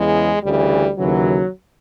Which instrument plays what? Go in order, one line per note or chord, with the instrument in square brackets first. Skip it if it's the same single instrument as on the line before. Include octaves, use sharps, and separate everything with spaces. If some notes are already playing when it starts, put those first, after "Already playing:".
Already playing: [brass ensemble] E2 C#3 E3 G#3
D2 C#3 E3 G3
D#2 C#3 E3 F#3